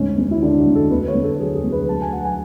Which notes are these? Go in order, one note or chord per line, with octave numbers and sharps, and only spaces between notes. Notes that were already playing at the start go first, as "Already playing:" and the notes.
Already playing: D2 G#2 C#4
D2
E4
D3 D4
F#4
D2
A4
D2 B4
C#5
D2
A4
F#3 G#4
G#4
D2
B4
F#3 A5
G#5
F#3 F#5
G#5